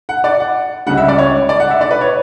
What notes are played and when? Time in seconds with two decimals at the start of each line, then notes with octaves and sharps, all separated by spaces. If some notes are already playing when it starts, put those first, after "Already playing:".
0.09 F#5
0.24 D5
0.40 F#5
0.86 C#2 C#3 G3 F#5
0.97 E5
1.08 D5
1.18 C#5
1.49 D5
1.60 F#5
1.70 E5
1.81 D5
1.91 B4
2.01 C#5